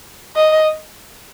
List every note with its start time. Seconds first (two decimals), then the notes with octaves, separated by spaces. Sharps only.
0.36 D#5